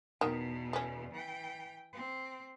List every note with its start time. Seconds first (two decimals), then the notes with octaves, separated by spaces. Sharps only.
0.21 E2 B2 D#3
0.73 A3 C#4
1.12 E3 G5
1.93 C4